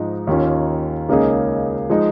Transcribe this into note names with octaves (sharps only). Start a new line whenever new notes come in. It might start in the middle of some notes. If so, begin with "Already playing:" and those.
Already playing: G#2 F3 G#3 D#4
D#2 D#3 C#4 F4
C#2 C#3 A#3 D#4 G#4
F3 G#3 D#4